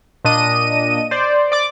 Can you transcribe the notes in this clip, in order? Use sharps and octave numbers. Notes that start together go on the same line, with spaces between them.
A#2 D4 D#5 D#7
C5 D5
D5 D6